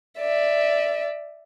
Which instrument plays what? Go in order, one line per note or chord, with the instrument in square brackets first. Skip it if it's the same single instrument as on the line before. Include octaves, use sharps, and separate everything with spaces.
[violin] D5 E5